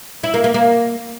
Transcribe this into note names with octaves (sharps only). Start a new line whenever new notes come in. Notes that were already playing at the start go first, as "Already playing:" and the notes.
E4
A#3
A#3
A#3